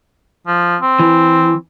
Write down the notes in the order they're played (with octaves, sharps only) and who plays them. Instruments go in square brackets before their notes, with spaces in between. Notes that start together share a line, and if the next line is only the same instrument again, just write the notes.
[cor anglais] F3
C4
[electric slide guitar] E3